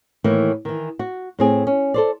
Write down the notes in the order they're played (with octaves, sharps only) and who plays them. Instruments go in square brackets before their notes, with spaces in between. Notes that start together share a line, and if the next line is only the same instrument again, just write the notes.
[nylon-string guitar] A2 D#3 E3 A#3
D#3 E3
F#4
A2 C4 G#4
C#4
A4 C5 D5